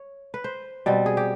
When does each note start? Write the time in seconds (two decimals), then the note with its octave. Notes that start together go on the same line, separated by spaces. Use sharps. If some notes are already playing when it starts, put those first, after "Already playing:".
Already playing: C#5
0.34 B4
0.44 C5
0.86 B2 G3 C4
1.06 G#4
1.17 G4